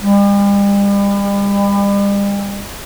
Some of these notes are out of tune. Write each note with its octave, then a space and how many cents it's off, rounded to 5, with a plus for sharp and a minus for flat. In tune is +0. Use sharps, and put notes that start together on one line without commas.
G3 +40